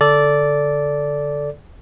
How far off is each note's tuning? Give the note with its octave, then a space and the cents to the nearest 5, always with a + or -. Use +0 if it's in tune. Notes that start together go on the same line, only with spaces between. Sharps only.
D3 -15 A4 +0 D5 -10